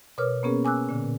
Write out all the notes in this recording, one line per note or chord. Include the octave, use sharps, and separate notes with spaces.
B2 A#4 B4 C#5 D6 F6
A#3 B3 C#4 G#4 A#4
G#5 D6 E6 F#6
A#2 D3